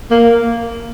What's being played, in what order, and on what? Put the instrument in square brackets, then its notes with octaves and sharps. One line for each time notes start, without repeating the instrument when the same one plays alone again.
[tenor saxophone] A#3